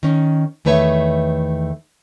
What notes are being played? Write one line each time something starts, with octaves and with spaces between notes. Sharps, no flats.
D#3 C#4
E2 D#3 A3 B4 C#5 E5